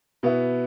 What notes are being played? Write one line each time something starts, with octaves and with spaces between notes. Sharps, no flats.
B2 B3 E4